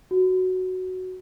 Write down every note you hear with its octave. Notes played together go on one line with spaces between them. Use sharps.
F#4